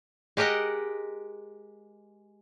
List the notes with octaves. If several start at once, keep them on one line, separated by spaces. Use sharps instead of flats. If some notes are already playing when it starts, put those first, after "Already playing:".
G#3 G4 A#4 D#5 F#5